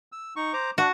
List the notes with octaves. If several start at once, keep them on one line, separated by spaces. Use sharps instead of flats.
E6
D#4 C#6
C5 A#5 D6
D4 F#4